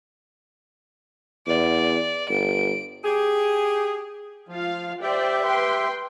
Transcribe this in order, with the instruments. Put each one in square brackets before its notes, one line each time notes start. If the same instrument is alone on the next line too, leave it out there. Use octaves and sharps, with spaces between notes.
[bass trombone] E2 [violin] D5
[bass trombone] G1 [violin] D7
[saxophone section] G4 G#4
[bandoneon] F3 [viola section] F4 F5
[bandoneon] G4 E5 [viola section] C5 D5 G5
[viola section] B4 G5 C6